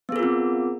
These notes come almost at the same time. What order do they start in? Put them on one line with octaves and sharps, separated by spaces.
B3 G#4 A#4 F4 C4